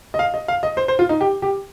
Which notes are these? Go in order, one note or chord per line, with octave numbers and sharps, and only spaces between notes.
D#5
F5
D#5
F5
D#5
C5
C5
F4
D#4
G4
G4